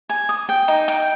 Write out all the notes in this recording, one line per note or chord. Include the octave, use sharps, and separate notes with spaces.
G#5
D#6
G5
D#4
G5